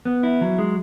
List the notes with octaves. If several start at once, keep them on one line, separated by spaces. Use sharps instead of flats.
B3
E4
F#3
G#3